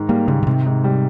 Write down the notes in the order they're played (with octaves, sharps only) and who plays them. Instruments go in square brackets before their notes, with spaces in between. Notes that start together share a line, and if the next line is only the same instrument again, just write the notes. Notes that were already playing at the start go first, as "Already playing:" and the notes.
Already playing: [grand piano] G#2 D#3
[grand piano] G3 [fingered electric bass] A#3
[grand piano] G#2 [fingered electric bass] C#3
[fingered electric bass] C#3
[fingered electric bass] C3 [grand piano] D#3
[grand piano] G#2
G3